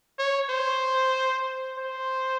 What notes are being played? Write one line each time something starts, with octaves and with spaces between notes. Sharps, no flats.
C#5
C5
C5